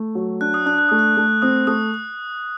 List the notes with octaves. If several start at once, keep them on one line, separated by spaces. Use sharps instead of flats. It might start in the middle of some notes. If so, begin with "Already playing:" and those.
Already playing: A3
F#3
D4 F#6
D#6
D4 F#6
F#6
A3 D#6
F#6
A3
C4 D#6
A3 D#6